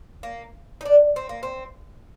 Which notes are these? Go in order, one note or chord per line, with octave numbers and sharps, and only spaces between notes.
A#3
D#4
D4
C4
A#3
C4